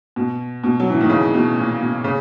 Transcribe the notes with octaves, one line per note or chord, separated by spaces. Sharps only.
B2
B2
F#3
E3
D#3
C#3
B2
A#2
B2
C#3